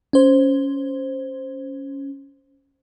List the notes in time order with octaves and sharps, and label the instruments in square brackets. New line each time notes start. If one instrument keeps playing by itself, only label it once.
[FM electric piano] C#4 C5